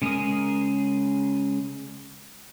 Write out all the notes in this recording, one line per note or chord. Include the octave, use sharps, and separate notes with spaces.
C#3 G#3 G#4 A#4 D#6